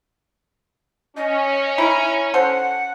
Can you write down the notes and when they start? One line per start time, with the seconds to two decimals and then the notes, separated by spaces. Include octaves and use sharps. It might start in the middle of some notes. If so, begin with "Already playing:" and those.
1.17 C#4 D#5
1.78 E4 A#5
2.34 A4 C5 F#5